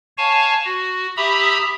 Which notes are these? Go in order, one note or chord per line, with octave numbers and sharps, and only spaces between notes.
C#5 F5 G#5 A5 C#6
F#4
G4 E5 A#5 B5 D#6 E6